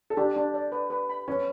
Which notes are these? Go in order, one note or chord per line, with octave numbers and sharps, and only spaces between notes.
A4
D4 G4
D4
D5
B4
B4
B5
C#4 B4